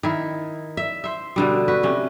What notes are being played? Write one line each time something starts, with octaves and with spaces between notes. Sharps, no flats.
D#3 E4
E5
C5 E5
B2 D3 G3
F#4 B4
C3 C#4